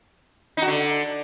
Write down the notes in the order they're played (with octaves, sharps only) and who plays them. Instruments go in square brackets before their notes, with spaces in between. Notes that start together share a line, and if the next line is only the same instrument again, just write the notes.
[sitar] D#4
F#4
D3